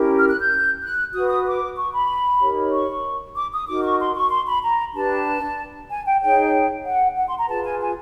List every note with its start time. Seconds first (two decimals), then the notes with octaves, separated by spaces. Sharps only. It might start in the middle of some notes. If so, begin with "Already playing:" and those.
Already playing: C#4 E4 G4 A#4
0.18 F6
0.29 F#6
0.39 G6
0.82 F#6
1.13 F#4 B4 D#6
1.29 D#6
1.46 D6
1.77 C#6
1.93 B5
2.41 D#4 G4 A#4 C#5
2.72 C#6
3.35 D6
3.52 D#6
3.67 D#4 F#4 A#4 D6
3.84 C#6
4.00 C6
4.15 C#6
4.30 C6
4.47 B5
4.62 A#5
4.94 D4 G4 B4 A5
5.90 G#5
6.06 G5
6.21 D#4 G#4 C#5 G5
6.85 F#5
7.16 F#5
7.27 C6
7.38 A#5
7.48 F4 G#4 B4 A5
7.64 G#5
7.80 G#5